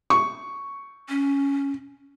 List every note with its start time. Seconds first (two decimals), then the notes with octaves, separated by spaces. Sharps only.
0.10 C#6
1.09 C#4